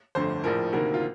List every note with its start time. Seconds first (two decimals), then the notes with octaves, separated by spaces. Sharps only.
0.15 G1 F2 D3 A3 C5
0.44 A#1 A2 F3 A#4
0.72 D2 C3 D#3 A#3 A#4
0.94 F4